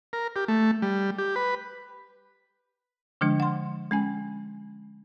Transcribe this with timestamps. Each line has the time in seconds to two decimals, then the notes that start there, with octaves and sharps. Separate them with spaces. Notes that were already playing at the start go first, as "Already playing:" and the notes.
0.13 A#4
0.36 G4
0.48 A3
0.82 G3
1.18 G4
1.36 B4
3.21 D3 F3 G#3 D4
3.40 F#5 C6
3.91 G#3 C#4 G#5